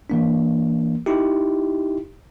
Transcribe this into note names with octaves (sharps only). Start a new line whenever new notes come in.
E3 A#3 D4
D#4 E4 G4